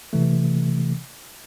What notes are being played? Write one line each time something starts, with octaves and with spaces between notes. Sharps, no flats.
C3 E3 A3